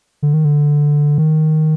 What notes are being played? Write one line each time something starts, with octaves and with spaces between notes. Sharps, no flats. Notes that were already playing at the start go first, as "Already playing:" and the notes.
D3
D#3
D3
D#3